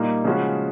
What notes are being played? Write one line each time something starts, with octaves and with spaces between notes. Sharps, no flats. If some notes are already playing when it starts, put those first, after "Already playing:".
Already playing: A#2 G3 A#3 D#4
C#3 F3 G#3 C#4 F#4